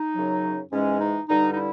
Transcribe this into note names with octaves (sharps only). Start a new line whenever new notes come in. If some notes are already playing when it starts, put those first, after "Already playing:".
Already playing: D#4
F#2 C#3 F#3
G#2 E3 G#3 C#4
D#4
G2 D3 G3 D#4
D#4
E4